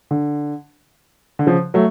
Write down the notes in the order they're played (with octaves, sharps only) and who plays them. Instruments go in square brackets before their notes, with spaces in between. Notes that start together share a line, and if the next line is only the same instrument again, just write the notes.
[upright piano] D3
D3
C#3 F3
F#3 A3